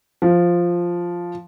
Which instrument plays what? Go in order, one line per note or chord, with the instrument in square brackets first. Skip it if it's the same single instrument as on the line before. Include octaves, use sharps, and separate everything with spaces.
[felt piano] F3